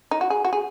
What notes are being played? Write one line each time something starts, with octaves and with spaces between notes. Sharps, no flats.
D#4
F#4
G#4
F#4
G#4